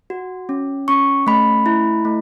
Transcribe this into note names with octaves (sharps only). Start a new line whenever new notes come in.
F#4
C#4
C#4 C#6
A3 B5
E4
A3